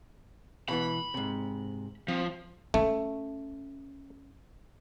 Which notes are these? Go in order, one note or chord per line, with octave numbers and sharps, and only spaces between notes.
B2 E3 B3 B5
G#2 C3
F3 C4
A3 C#4